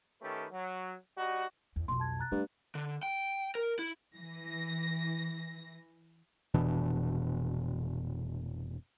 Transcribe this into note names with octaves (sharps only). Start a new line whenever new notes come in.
D#3 A3 C#4 G4 A4 B4
F#3
G3 D#4 F#4
E2
B1 F2 C6
A5 G#6
A#5 F#6 A6
G2 A3
D3
G5
A#4
E4
E3 A#6
F1 B2 E3 D4